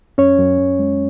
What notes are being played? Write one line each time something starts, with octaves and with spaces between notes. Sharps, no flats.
F#2 C#4 C#5
F#2
F#2
G#3